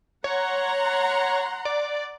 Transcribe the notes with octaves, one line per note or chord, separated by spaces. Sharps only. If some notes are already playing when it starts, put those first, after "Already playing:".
C#5 F#5 A#5 C6
D5